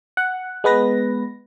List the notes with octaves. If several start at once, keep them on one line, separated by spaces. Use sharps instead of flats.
F#5
G#3 B3 B4 A#6